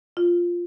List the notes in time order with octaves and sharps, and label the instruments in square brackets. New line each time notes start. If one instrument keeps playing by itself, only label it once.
[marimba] F4